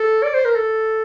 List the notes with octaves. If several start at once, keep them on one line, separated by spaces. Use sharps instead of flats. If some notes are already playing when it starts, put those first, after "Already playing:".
Already playing: A4
D5
C5
A#4
A4